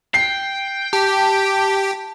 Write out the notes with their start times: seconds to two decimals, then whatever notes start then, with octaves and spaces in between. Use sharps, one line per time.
0.14 G5 C7
0.93 G4 A5